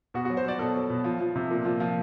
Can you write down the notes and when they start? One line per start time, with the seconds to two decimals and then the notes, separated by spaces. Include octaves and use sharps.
0.14 B2 F#4
0.25 F#4
0.30 F#3
0.37 C5
0.45 F#3 D5
0.59 B2 A4
0.75 F#3
0.90 B2
1.04 F3
1.21 F3
1.36 C3
1.51 A#2
1.65 F3
1.80 F3